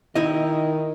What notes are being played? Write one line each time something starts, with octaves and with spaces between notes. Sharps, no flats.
D#3 E4 D#5